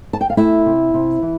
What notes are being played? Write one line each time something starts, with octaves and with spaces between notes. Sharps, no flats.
A5
G5
F5
A3 E4 E5
C3
C3
E3